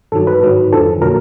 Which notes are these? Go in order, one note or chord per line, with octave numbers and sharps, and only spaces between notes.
G2 D#3 F#3 A4
B4
G#2 D#3 F#3
F2 D3 F3 A4
A#2 F#3 A#4